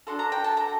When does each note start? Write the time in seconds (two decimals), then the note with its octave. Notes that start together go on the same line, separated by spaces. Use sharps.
0.07 D4 F#4 A4 C6
0.19 A#5
0.32 G5
0.44 A5
0.57 A#5